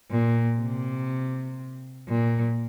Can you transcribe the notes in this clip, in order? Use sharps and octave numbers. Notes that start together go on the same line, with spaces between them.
A#2
C3
A#2